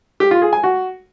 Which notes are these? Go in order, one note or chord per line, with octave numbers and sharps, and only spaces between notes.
G4
F4
G#4
G#5
F#4